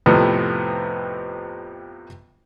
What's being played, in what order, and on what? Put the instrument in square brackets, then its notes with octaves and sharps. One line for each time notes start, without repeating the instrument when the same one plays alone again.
[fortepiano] F2 A2 C3 F3 B3